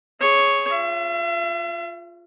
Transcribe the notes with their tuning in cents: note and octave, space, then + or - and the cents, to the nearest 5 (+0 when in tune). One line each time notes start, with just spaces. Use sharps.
G#4 +5 C#5 +0
F4 +0 E5 +45